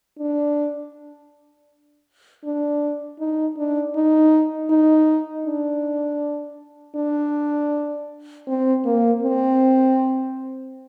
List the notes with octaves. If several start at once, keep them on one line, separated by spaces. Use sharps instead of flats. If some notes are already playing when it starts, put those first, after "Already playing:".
D4
D4
D#4
D4
D#4
D#4
D4
D4
C4
A#3
C4